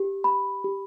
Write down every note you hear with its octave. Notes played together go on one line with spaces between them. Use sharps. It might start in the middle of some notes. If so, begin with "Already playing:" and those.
Already playing: G4
B5
G4